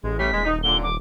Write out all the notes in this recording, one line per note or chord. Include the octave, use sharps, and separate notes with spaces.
A1 G#3
G3 A3 C#4 B6
D#1 G#3
D#4
A#2 D3 G7
D6